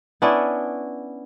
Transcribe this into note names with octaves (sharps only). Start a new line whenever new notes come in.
B3 C#4 D4 E4